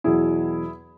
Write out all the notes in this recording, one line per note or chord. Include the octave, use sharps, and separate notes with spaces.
E2 B2 F#3 E4 G#4